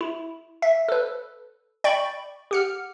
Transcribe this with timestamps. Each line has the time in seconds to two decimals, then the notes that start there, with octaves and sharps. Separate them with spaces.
0.01 E4
0.62 E5
0.89 A4 B4
1.84 D5 G5 B5 C#6
2.51 G4 F#5 F6